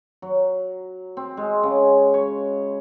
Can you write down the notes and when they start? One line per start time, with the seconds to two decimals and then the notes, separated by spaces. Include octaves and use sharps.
0.22 F#3
1.17 C4
1.37 G#3
1.63 C#3
2.14 C#5